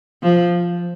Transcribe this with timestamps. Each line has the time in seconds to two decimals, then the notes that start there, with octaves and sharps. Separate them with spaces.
0.23 F3